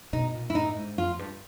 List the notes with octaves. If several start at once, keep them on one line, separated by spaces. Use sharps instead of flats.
B2 D#4
A#2
E4
A2 D#4
G#2
F2 F4
G2